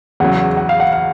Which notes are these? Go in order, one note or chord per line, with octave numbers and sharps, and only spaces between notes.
E2 C#3 F#3 F#5
F#5
F5
F#5
F5